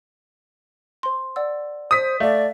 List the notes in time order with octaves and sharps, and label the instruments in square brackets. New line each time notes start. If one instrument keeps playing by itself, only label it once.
[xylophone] C5 C6
D5 F#5 E6
[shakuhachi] C5 [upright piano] D#6 B6
[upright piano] A3 [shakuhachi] D5 [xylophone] E5 F5